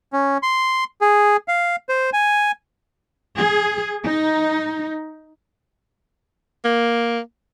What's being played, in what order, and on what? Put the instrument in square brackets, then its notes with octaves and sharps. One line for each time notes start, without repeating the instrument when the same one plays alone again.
[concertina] C#4
C6
G#4
F5
C5
G#5
[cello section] G#4
D#4
[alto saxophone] A#3